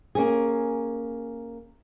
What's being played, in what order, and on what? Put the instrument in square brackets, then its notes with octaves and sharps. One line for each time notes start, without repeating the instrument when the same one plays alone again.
[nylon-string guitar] A#3 C#4 G#4